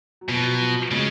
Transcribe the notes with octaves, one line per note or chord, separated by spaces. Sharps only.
F#3
B2 F3
F#3
F3
F#3
C#3 G#3